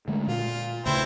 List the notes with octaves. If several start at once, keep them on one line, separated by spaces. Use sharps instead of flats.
D3 G#3 A3
A#2 F4
D2 C#3 A3 C4 E4